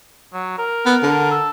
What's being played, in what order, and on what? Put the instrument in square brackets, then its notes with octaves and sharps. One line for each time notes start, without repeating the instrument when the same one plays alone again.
[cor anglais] F#3
A#4
[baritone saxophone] B3
D3
[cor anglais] A4